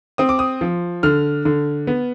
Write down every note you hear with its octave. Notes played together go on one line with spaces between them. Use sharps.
C4 D#6
D6
D#6
F3
D3 F6
D3
B3